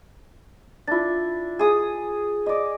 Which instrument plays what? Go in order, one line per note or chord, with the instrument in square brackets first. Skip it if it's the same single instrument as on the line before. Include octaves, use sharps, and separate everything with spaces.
[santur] D4 E4 [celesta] F4 A6
[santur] G#4 D#6
D5 D#5